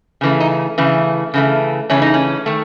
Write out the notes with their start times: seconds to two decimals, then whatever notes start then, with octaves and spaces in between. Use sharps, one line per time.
0.21 C#3 E3 A3
0.40 D#4
0.78 C#3 E3 A3
1.34 C#3 E3 A3
1.90 C#3 E3 A3 C#4
2.02 D#4
2.14 C#4
2.46 D#3 A3